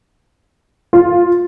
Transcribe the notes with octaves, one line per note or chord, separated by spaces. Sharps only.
F4